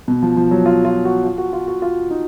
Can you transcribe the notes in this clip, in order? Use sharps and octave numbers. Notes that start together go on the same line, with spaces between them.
B2
F3
F3
F#3
F4
F4
F#4
F4
F#4
F4
F#4
F4
D#4